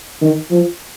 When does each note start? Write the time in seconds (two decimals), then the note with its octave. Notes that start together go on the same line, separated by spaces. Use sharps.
0.22 D#3
0.50 F3